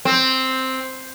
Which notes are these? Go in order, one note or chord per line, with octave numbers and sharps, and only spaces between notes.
C4